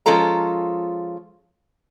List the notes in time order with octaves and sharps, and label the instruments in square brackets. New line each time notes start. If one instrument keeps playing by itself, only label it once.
[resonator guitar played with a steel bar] F3 G#3 C#4 F4 A4 A#5